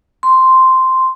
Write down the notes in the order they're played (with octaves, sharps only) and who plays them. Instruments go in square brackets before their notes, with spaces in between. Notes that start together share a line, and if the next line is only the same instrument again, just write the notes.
[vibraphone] C6